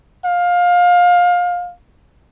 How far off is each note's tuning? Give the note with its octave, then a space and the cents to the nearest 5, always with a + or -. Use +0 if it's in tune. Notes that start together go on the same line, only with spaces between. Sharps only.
F5 +25